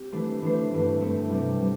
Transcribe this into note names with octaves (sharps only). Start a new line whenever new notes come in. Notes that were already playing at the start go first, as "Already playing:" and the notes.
Already playing: C4 G4
E3 A3 D4 C5
E3 A3 D4 C5
G2 E3 A3 C4
G2 E3 A3 C4
C3 G3 C4
C3 G3